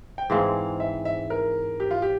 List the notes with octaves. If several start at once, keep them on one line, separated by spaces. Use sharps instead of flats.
G5
G#2 E3 G#3 C4 F5
E5
E5
A#4
G4
F4
G4